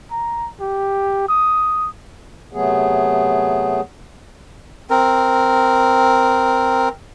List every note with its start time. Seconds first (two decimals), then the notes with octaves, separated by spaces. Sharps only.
0.11 A#5
0.61 G4
1.28 D#6
2.53 C3 F#3 A3 B3 G#4
4.90 C4 A#4